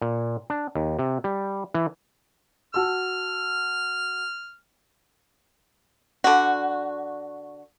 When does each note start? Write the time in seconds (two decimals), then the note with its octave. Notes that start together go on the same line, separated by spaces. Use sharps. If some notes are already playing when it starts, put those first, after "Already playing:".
0.01 A#2
0.50 D4
0.75 D#2
0.99 C3
1.24 G3
1.74 E3
2.74 F#4 A5 E6 F6
6.24 D3 F#4